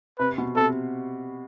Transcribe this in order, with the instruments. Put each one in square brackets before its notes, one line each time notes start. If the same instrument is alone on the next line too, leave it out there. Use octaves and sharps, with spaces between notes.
[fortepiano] C3 [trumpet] B4
[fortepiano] B2
[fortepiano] C3 [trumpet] A4